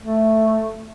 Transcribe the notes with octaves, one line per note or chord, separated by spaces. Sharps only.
A3